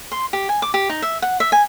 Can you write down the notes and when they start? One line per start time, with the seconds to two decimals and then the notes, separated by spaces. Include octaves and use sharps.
0.12 C6
0.33 G4
0.49 G#5
0.62 D6
0.74 G4
0.89 D#4
1.02 E5
1.22 F#5
1.40 E5
1.52 G#5